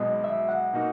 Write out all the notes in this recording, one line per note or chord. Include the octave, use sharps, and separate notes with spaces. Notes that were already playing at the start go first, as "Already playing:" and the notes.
Already playing: B1 B2 G#3 B3 D#5
E5
F#5
B2 A#3 D#4 F#4